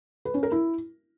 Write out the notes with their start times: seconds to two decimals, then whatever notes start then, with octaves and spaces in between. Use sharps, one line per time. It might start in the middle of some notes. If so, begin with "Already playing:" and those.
0.25 B4
0.34 C#4
0.43 A#4
0.52 E4